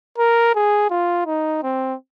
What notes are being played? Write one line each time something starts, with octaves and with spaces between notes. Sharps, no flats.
A#4
G#4
F4
D#4
C4